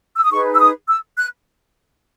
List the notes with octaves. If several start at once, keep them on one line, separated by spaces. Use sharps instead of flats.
E6
D#6
D#4 G#4 B4 C#6
E6
D#6
E6
F#6